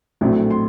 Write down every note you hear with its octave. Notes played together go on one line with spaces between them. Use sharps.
A#1 A2 F#3 A3 C4
C6